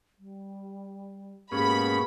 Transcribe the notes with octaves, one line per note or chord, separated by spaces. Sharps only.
G3
G#2 B2 A#3 C#4 G4 G#4 B5